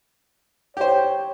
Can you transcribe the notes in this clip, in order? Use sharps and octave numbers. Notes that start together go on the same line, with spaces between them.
G4 C5 C#5